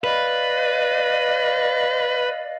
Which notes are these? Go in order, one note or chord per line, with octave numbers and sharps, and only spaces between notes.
B4 D5 D#5 F5